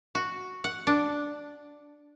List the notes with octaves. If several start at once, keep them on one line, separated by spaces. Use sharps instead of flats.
F#4
F#5
D4